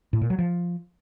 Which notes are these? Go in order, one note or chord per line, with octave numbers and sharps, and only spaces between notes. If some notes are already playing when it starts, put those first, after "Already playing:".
A2
A#2
F#3
F3